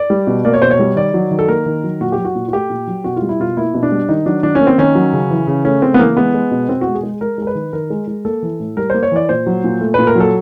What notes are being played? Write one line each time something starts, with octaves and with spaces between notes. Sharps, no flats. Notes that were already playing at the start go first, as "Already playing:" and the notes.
Already playing: D5
G3
B2
A#3 D5
C#5
B2 C5
C#5
G3
D#3 D5
F#3
D#3
A4
A#3 A#4
D#3
F#3
A#2 F#4
G4
F#3
F#4
A#2
F#4
A3 G4
A#2
F#3
B2 F#4
F4
G3
E4
B2 F4
A#3 E4
B2
D4
G3
D#3 D#4
F#3 D4
D#3 D4
C#4
A#3
C4
D#3 C#4
F#3
C#3
E3
C#3
A3 C#4
C#3 C4
B3
E3 A#3
G#3 B3
G#3
B2
B2 C4
F#4
G#3
G#4
G#3
G#3 A#4
G#3 A#4
B4
D#3
D#3 A#4
G#3
G#3
A#3 A4
E3
A2
G3 A#4
A#3 C5
C#5
E3 D5
A#2 C5
F#3
A#2
A3
A#2 B4
A#4
F#3 A4